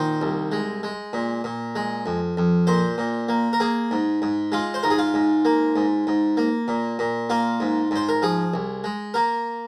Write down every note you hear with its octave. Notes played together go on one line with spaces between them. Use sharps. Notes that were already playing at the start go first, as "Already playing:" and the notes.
Already playing: A#2 D#3 C5
C2
G#3
G#3
A#2
A#2
G#3
F2
F2
A#2 C5
A#2
A#3
A#4
A#3 G#4
G#2
G#2
G#3 F4
C5
G#2 A#4
G#4
F4
G#2
A#3
G#2
G#2
A#3
A#2
A#2
A#3 F4
G#2
G#2 C5
A#4
F3 G#4
C2
G#3
A#3 A#4